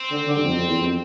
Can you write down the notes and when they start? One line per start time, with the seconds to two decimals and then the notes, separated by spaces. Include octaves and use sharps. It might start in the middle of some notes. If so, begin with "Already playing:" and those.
Already playing: C4
0.11 D3
0.27 D3
0.36 G2
0.45 F2
0.56 F2
0.67 E2
0.78 F2